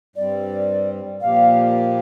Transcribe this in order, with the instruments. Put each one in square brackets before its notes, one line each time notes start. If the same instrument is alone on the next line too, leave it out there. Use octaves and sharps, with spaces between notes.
[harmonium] G2 G3 C4 [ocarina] D5
[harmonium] A#2 F3 A#3 G4 [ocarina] F5